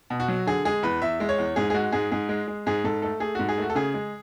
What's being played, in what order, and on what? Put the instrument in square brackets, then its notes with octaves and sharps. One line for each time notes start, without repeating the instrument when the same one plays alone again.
[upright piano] B2
F#4
F#3
D3 G#4
G#3 G#4
E2 B4
E2 E5
G#3
C#5
E2
G#2 G#4
G#4
G#3 F#4
G#2 G#4
G#2 G#4
G#3
G#3
G#2 G#4
G#2 A4
A3 A4
A3 G#4
G#2 F#4
G#4
A3 F#4
A4
C#3 G#4
G#3